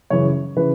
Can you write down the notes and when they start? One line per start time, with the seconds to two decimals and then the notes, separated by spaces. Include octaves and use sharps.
0.10 F#2 C#3 E3 C#5
0.57 C#3 E3 B4